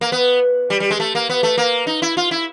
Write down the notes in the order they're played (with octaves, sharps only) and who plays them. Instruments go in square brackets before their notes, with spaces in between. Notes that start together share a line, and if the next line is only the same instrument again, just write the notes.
[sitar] A#3
B3
G3
G3
G#3
A3
A#3
B3
A3
A#3
D#4
E4
F4
E4